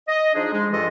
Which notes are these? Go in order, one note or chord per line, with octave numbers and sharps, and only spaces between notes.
D#5
F3 D4 D#4 G#4
G#3
G2 E3 F3 F4 A4 D#5